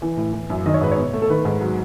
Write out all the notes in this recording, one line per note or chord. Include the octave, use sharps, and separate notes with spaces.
E3
A2
E3
F#2
D#3 D#5
C#5
G#2 B4
C#5
B2
A3
A4
D#3 B4
G#2
F#3